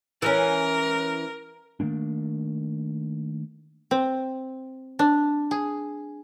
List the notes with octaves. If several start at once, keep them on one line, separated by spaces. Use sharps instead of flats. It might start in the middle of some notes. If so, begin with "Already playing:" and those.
E3 C#4 A#4
D#3 A3 A#3 D4
C4
D4
G#4